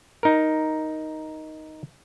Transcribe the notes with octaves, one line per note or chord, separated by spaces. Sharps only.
D#4 A#4